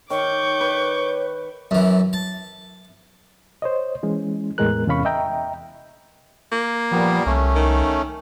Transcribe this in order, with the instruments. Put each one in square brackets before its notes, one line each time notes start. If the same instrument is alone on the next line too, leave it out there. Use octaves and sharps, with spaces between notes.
[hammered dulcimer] D#3 [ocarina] C#5 [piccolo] C#6 [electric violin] D6 G6
[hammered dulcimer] B4
[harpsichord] F#2 E3
A5
[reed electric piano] C5 C#5 D#5
E3 G#3 C#4
E2 A2 G#3 B3 A#4 F#6
E2 C3 C#4 F5 B5 C#6
D#5 E5 G5 A#5
[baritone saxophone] A#3
[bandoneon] A#2 G3 B3 [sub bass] F3
[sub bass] C2 [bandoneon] A3 C#4
[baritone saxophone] D#3